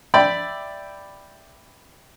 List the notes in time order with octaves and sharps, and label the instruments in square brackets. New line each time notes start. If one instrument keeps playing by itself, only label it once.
[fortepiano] D5 E5 G5 B5